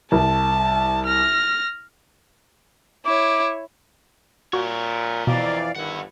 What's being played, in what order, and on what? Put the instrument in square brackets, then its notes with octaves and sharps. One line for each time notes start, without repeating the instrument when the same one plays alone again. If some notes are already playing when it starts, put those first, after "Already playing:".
[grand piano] C2 [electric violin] A5
[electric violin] F6 A#6
[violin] E4 C#5 [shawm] D6
[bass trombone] A#2 [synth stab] F#4 [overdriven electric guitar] A#4 C#5
[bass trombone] F2 [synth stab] B2 [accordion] E3 D5 F5
[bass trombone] G1 [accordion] D#3 [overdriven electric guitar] E4 F#5